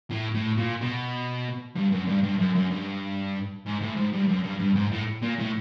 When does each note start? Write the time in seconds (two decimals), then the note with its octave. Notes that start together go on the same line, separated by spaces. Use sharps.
0.10 A2
0.34 A2
0.57 A#2
0.81 B2
1.76 G2
1.92 F#2
2.07 G2
2.23 G2
2.39 F#2
2.55 F#2
2.71 G2
3.66 G#2
3.82 A2
3.96 G#2
4.13 G2
4.29 F#2
4.44 G2
4.59 G2
4.76 G#2
4.92 A2
5.22 A#2
5.39 A2